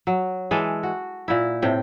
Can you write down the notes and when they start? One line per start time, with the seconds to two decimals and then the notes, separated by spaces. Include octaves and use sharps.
0.07 F#3
0.51 E3 G#3 A4
0.83 F#4
1.28 A#2 E4
1.62 A2 C3 G5